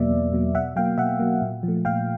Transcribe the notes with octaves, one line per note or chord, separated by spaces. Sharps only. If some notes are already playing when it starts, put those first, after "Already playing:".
Already playing: E2 B2 F#3 A#3 D5 E5
E2
B2 F#3 A#3
B2 E5 F#5
F#3 A#3 F5 G5
B2 E5 F#5
F#3 A#3
A#2
F3
A3
A#2 F5 G5